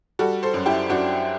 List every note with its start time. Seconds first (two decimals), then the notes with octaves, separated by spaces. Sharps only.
0.19 G3 F#4 A4
0.43 A4 C5
0.54 F#2
0.66 E4 G4
0.89 F#2 D4 F#4